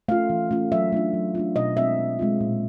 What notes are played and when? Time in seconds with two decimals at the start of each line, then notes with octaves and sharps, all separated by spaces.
0.08 A3 C#4 F4 F5
0.30 E3
0.51 A3 C#4 F4
0.72 F#3 E5
0.93 A3 D4 F4
1.14 F#3
1.35 A3 D4 F4
1.56 B2 D#5
1.77 G#3 C4 F4 E5
1.98 B2
2.19 G#3 C4 F4
2.41 A#2